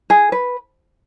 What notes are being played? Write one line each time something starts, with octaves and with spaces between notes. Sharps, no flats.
G#4
B4